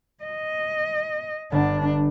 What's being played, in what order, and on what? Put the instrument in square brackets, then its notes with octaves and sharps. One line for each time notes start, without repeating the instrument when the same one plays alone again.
[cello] D#5
[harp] G1 [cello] D4